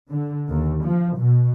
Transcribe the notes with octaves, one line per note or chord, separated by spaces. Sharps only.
D3
D#2
F3
B2